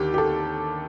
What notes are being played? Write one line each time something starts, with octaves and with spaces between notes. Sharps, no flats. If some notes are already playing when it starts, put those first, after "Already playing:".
Already playing: D#2 D3 G4
G4
A4